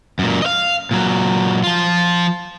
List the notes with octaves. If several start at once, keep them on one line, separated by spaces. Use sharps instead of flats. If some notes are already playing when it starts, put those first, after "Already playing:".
F#2 A#2
D#5 F5
A#2 F#3
F3 F4